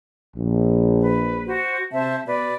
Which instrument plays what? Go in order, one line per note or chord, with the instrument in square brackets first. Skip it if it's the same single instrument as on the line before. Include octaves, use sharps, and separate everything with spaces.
[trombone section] A#1
[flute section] B4
F#4 C5
[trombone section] C3 [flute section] C5 E5 A5
[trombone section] B2 [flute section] B4 D5